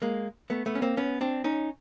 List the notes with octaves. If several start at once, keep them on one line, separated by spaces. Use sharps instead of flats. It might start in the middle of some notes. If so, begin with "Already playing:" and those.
G#3 A#3
A3 B3
A3 B3
C#4
A#3 C4
B3 C#4
C4 D4
C#4 D#4